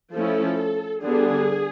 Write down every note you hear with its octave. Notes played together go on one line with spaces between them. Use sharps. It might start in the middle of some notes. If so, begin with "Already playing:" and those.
F3 A3 C#4 E4 A4
D3 G3 B3 D4 G#4